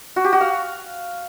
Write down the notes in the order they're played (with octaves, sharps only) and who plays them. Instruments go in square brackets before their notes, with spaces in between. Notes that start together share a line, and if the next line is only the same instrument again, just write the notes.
[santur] F#4
G4
F#4
F5